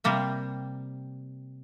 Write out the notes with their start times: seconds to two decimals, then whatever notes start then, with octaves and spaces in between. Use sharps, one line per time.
0.04 C3 G3 A#3 E5